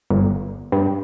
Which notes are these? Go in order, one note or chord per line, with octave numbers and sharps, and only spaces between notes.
G1
G2